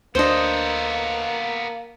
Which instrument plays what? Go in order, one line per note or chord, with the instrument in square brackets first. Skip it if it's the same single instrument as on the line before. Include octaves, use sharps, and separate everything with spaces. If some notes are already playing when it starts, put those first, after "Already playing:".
[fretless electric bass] D2 D4 [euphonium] A#3 [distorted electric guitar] B3 A4 [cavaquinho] C5 D#5